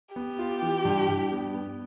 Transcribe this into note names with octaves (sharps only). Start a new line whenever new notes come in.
B3 G4
F4
E3
G2
G2
B3
B3